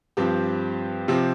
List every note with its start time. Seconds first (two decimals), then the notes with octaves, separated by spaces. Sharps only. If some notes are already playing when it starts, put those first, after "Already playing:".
0.17 G2 F3 C4 G4
1.08 C3 F3 C4 G4